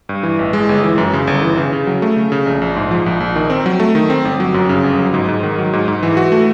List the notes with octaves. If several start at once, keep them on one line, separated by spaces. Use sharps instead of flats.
G2
E3
A1
G#3
G1
E3
F#2
C#3
G1
E3
C#3
C#3
F#3
A3
C#3
C#3
A#1
A#1
G#2
F3
A#1
A#1
D#3
C4
F#3
A3
D#3
C4
G1
F#3
F#2
C#3
G1
F#3
G#2
G#2
D#3
F#3
G#2
G#2
E3
F#4
A3